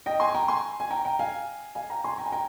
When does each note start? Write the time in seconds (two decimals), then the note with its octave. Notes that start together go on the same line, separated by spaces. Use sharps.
0.06 D#5 G5
0.20 G#5 C6
0.34 G5 A#5
0.48 G#5 C6
0.80 G#5
0.90 G5 A#5
1.05 G5 A#5
1.19 F5 G#5
1.75 F5 G#5
1.90 G5 A#5
2.04 G#5 C6
2.18 G5 A#5
2.26 G#5
2.32 G5 A#5